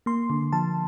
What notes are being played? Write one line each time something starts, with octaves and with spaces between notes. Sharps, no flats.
A#3 C6
D3
F3 A5